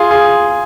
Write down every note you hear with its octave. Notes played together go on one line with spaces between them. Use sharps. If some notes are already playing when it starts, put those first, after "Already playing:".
Already playing: F4 G#4
F4 G#4